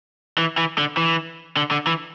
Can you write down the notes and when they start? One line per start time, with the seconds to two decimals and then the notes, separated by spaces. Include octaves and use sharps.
0.38 E3
0.58 E3
0.78 D3
0.97 E3
1.57 D3
1.71 D3
1.87 E3